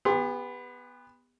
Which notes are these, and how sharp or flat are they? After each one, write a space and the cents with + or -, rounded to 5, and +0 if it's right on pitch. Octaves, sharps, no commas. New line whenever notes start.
B3 +0 G4 +45 C6 +0